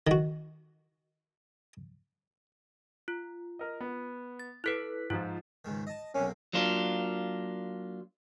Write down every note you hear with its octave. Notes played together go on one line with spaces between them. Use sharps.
D#3 F#4
F4
A#4 D#5
B3
A6
E4 A4 B4 F#6 B6 D7
G#2 F3 F4
C#2 G#2 D#3
D#5 A5
B1 C3 A#3 C#4
F#3 A#3 D4 F4